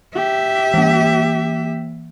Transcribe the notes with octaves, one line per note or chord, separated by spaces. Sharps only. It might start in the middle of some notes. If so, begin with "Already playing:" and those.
G4 E5
E3 A#3